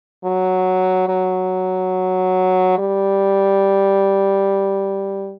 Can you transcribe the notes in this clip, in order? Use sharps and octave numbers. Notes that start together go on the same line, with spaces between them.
F#3
F#3
G3